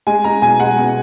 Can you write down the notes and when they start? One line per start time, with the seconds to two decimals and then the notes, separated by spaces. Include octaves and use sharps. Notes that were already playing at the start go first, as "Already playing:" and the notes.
0.07 G#3 G#5
0.24 G#3 A#5
0.42 B2 G#5
0.60 G#3 F#5
0.78 B2